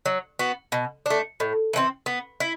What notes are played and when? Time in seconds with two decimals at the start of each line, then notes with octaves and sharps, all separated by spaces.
0.05 F#3
0.39 B3 F#4
0.72 B2
1.06 A3 D4
1.40 A2
1.73 E3 A3 C4
2.06 B3
2.40 E4